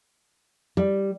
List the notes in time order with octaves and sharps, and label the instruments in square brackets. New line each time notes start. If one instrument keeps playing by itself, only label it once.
[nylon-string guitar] G3